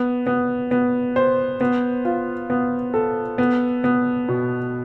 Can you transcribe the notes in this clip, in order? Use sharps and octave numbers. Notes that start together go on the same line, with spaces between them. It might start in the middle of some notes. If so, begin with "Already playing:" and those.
Already playing: B3
B3
B3
C5
B3
F4
B3
A4
B3
B3
B2